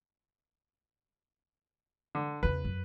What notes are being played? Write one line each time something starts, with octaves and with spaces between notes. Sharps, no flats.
D3
E2 C#3 B4
F#2